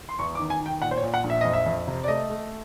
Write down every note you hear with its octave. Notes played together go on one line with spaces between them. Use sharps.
C6
E2 C#6
D6
D#3
G#5
D#3
G5
A#2 F#5
C5
C#5
A#2
F#5
A#1
E5
F2 D#5
E5
F2
C3
D5
A3 D#5
A3